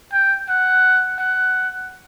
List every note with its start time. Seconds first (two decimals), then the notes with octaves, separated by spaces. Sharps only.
0.13 G5
0.49 F#5
1.19 F#5